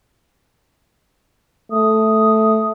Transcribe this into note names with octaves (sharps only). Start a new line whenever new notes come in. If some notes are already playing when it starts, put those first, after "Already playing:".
A3 D#6